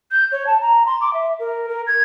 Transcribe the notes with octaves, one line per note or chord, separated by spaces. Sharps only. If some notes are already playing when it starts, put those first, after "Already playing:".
G6
C#5
A5
A#5
C6
D6
E5
A#4
A#4
G#6